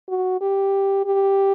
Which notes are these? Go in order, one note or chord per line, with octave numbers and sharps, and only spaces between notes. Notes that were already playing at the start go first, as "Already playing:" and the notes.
F#4
G4
G4